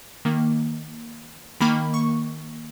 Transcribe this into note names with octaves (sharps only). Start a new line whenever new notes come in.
D#3 A#3
D#3 A#3 B5
C#6